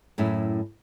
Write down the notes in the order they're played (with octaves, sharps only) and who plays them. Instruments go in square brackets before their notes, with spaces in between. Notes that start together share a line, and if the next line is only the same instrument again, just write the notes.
[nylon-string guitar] F#2 A2 C#4 E4